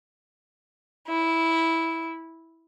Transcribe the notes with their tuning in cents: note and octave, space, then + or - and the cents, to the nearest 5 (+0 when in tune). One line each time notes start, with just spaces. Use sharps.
E4 -10